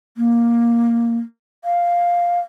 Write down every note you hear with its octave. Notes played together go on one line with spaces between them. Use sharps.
A#3
F5